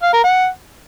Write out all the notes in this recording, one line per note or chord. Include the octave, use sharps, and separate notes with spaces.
F5
A#4
F#5